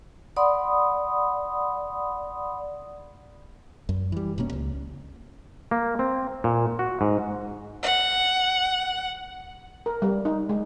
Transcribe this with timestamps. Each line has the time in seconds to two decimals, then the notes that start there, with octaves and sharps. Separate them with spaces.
0.36 D5 F#5 B5 C6 D#6
3.89 F#2
4.12 E3 G3
4.38 E1 B2 A#3 C#4
4.53 C#2
5.71 A#3
5.99 C4
6.44 A#2
6.79 F#4
7.01 G#2
7.83 F#5
9.86 A#4
10.02 G3
10.25 D#4
10.49 G#3